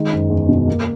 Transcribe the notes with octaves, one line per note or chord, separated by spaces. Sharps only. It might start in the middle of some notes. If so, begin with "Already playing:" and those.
Already playing: D#3 G#3
F#1
E2
B2
A#3